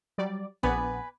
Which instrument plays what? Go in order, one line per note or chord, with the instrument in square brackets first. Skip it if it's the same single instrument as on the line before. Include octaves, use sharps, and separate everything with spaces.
[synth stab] F#3 G3 D5
[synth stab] A#1 B3 [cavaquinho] B4 D5 G#5